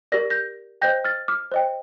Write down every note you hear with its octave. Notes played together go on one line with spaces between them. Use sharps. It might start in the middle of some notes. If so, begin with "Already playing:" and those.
G4 A#4 D5 A#6
G6 A#6
C5 D#5 G5 G6 A#6
F6 A6
D6 F6
C5 D#5 G5